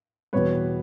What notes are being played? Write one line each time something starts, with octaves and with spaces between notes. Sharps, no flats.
E2 B2 G3 B4 C#5